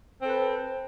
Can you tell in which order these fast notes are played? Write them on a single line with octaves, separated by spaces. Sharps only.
C4 A4 B4